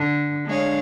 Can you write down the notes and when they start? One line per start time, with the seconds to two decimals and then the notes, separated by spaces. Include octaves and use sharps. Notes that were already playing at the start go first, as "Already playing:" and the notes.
Already playing: D3
0.45 G#3 D4 G#4 C#5 F5